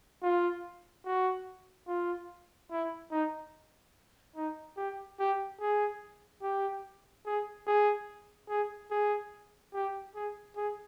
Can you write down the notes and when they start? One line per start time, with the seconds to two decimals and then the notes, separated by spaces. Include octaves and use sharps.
0.23 F4
1.05 F#4
1.87 F4
2.71 E4
3.11 D#4
4.36 D#4
4.77 G4
5.19 G4
5.61 G#4
6.42 G4
7.26 G#4
7.67 G#4
8.49 G#4
8.91 G#4
9.74 G4
10.15 G#4
10.56 G#4